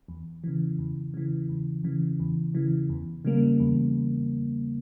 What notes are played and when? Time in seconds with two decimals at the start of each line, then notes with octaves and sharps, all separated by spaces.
0.08 E2
0.44 C#3 E3
0.79 E2
1.14 C#3 E3
1.49 E2
1.84 C#3 E3
2.20 E2
2.55 C#3 E3
2.90 E2
3.25 C#3 G3 A#3
3.60 E2